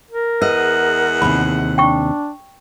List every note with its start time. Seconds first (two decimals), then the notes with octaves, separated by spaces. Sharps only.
0.11 A#4
0.42 E2 G#3 B4 D#5 F#5
1.22 D#2 C3 B5
1.78 D4 G5 C#6